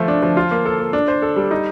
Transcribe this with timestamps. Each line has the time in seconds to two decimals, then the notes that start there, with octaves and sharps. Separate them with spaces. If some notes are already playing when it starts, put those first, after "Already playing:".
Already playing: F3 A3
0.08 D4
0.22 F3
0.37 F4
0.51 A#3
0.66 A4
0.79 A#3
0.93 D4
1.08 C5
1.22 A4
1.36 G3
1.51 D#4